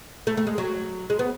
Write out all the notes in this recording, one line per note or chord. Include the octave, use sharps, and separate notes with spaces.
A3
A3
G#3
F#3
G#3
B3